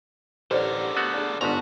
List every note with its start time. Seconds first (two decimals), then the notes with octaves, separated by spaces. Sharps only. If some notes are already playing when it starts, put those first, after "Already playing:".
0.51 A1 D3 G4 A#4 C5 D5 F#5
0.96 A3 B3 F#4
1.14 D4 G#4
1.41 G1 G#2 B3 D4 F#4 A5 A#5 B6